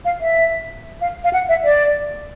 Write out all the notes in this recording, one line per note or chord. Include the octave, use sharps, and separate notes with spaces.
F5
E5
F5
F5
F#5
E5
D5